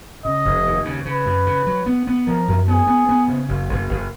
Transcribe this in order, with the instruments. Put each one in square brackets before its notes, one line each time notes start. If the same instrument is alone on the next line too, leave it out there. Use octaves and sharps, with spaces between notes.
[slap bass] C#3 [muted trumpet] D#5
[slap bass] F1
D#2
C#3
[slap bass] C#3 [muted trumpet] B4
[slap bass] F#2
C#3
F#3
B3
B3
[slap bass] F3 [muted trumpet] A#4
[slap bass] F#2
[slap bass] B3 [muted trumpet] G#4
[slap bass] B3
B3
C#3
F#1
F#1
F#1